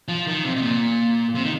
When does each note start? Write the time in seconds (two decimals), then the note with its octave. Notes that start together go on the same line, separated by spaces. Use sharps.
0.08 F3
0.27 D#3
0.45 C3
0.56 C3
0.62 A#2
1.35 C3
1.44 D#3